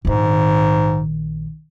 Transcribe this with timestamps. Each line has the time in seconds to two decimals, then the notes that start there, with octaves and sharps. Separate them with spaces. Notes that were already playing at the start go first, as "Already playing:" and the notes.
0.05 A#1 G#2 D#3